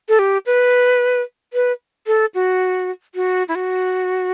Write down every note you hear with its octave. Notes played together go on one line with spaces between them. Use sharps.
A4
G4
B4
B4
A4
F#4
F#4
E4
F#4